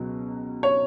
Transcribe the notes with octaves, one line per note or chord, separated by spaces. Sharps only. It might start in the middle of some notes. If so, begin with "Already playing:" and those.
Already playing: C#2 B2 F#3
C#5